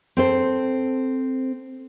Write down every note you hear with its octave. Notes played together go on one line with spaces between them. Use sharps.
C4 A4 C5